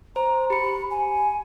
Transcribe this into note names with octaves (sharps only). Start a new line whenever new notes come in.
C5 A#5
G4 B5 C#7
G#5